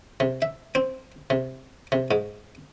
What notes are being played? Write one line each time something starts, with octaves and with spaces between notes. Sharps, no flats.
C3
E5
C4
C3
C3
G#2